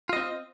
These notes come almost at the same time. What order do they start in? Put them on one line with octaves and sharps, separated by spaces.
F4 D#5 C4